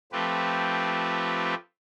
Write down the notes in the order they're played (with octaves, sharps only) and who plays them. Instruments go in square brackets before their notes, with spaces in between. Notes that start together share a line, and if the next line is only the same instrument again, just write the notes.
[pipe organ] F3 A3 C4 G4 B4